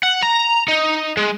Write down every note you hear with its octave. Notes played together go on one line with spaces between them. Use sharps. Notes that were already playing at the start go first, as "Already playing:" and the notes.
F#5
A#5
D#4
G#3